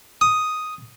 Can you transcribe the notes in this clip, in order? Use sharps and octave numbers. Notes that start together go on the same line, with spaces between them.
D#6